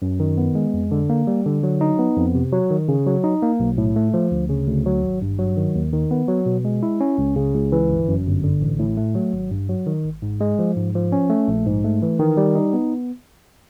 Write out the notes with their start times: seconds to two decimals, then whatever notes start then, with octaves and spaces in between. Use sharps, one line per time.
0.02 F#2
0.20 D#3
0.38 B3
0.55 G#3
0.73 F2
0.91 D3
1.10 A#3
1.27 G3
1.46 D3
1.63 F#3
1.81 D#4
1.99 B3
2.16 F2
2.35 C3
2.52 F#3
2.70 D#3
2.88 C#3
3.06 F#3
3.24 D#4
3.43 A#3
3.60 B1
3.78 A2
3.96 A3
4.14 F3
4.32 D2
4.50 C#3
4.67 D2
4.86 F#3
5.03 G#1
5.22 G2
5.39 F#3
5.57 D#3
5.75 D#2
5.93 D#3
6.11 B3
6.28 F#3
6.46 B2
6.65 G#3
6.83 E4
7.01 C#4
7.18 C#2
7.36 C#3
7.54 C#2
7.72 E3
7.90 G1
8.08 F#2
8.26 G1
8.44 D3
8.61 A1
8.79 A2
8.97 A3
9.15 F#3
9.33 G#1
9.51 G2
9.69 F#3
9.87 D#3
10.05 G#1
10.22 G#2
10.41 G#3
10.59 F3
10.76 G#2
10.95 F3
11.12 C#4
11.30 A3
11.48 A#1
11.66 G#2
11.84 A3
12.02 E3
12.19 D#3
12.37 G3
12.55 D#4
12.73 B3